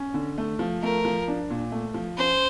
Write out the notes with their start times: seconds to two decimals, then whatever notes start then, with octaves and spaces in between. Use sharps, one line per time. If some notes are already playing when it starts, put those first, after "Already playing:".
Already playing: C#4
0.14 D3
0.38 A3
0.59 F3
0.82 A3 A#4
1.05 F3
1.28 D4
1.50 A#2
1.72 A3
1.94 F3
2.18 C#4 C5